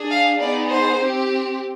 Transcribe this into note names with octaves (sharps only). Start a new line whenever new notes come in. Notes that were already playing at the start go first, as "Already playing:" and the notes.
Already playing: D4 G#4
F5
B3 D#4 G#4 D5
C5
C4 G4